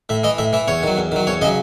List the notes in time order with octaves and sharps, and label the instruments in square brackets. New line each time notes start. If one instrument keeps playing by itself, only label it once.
[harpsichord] A2 E5
E3 D#5
A2 E5
E3 E5
E2 C#5
D#3 F#3
E2
D#3 F#3
E2 C#5
C#3 D#5
F#3